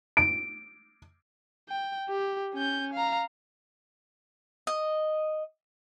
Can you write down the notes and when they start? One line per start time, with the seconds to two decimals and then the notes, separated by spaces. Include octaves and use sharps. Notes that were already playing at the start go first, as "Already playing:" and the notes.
0.17 D7
1.69 G5
2.09 G4
2.54 C#4 G6
2.93 F5 A#5
4.67 D#5